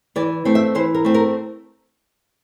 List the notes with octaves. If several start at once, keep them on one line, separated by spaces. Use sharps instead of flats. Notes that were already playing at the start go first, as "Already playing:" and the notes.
E3 D5
A3 C4
E5
E3 C5
A#4
A3 C4
A#4